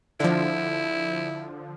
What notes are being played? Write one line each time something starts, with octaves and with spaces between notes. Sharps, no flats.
D3 F3 E4